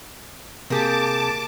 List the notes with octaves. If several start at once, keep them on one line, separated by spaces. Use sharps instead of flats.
C3 A#3 G4 G#4 A5 D6